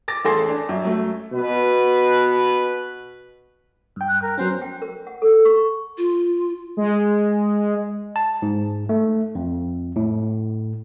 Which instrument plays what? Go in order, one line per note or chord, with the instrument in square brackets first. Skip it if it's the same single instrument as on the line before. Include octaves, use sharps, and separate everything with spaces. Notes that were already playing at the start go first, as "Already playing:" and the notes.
[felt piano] D6 A6 A#6
A1 G#4 A4 G#5 C6 A#6
D4
F#2
F#3 A3
[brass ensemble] B2 B4
[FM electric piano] G2 G5
[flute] F#6
A#4
[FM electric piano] F#3 B3 C#4 [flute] C5
[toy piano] G5
A#4
F#5
A4
C#6
[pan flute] F4
[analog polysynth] G#3
[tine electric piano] A5
G#2
A3
F2
A2